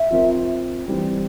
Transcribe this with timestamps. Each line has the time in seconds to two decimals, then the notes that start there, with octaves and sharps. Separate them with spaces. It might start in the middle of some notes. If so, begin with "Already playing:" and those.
Already playing: E5
0.11 F3 C4 F4 A#4
0.86 E3 G3 C4